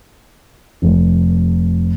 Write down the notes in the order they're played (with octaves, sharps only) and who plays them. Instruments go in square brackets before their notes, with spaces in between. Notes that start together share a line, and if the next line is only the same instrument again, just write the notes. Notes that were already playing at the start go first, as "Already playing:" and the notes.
[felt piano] F1